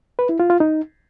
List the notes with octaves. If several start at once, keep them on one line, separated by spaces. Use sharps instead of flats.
B4
E4
F4
F4
D#4